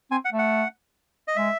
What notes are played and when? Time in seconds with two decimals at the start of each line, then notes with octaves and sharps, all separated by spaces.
0.11 C4 G#5
0.25 F#5
0.32 A3
0.39 F#5
1.28 D#5
1.36 G#3 E5